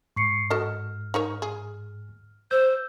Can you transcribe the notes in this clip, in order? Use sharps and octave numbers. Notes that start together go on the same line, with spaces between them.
G#2 C#6 C7 C#7
F#4 A4 D#5 F6
D#4 A#4 C#5
G#4
C5 E6 G6